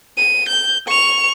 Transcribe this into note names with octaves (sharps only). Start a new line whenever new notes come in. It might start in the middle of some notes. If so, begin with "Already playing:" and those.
D#7
G6
C#6 F7